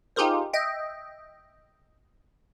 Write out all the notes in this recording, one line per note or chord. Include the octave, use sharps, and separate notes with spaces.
D#4 F4 G4 G#4 A#4 C5
D#5 E5 G5